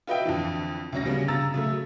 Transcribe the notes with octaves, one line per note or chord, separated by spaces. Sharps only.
F4 F#4 B4 D#5 E5 G5
F2 D3 E3
D2 C3 F#3 C#4 A#6
C#3 G3 B3 C#4 D4
C#3 B3 A#5 E6 A6
C#3 F#3 A3